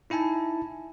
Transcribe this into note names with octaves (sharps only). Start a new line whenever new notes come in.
D#4 E4 E5 G#5 A5